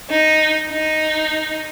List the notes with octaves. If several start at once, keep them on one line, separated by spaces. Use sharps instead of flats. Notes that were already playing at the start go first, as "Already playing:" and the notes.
D#4
D#4